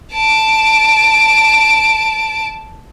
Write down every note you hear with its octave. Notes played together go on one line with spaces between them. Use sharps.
A5 D7